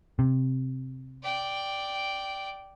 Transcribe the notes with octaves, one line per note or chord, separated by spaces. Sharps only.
C3
D5 G5